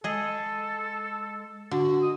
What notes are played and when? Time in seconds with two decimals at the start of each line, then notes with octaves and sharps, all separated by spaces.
0.04 G#3 G#4 A4 D#5
1.71 D3 F#4
2.02 D#5 D#6